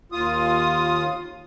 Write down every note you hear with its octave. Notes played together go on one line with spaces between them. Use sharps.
D#2 F4 D#6